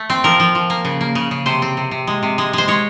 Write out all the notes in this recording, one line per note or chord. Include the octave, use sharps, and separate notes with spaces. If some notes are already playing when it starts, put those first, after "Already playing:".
Already playing: A3
C4
F3 A#4
F3
F3
A#3
C#3
A#3
C#3
C#3
C3 C5
C4
C3
C3
G#3
C3
G#3
G#3 C5
G#3 C#5